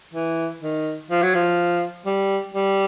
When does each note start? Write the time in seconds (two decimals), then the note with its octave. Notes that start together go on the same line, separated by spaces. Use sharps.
0.14 E3
0.62 D#3
1.11 F3
1.22 F#3
1.35 F3
2.06 G3
2.54 G3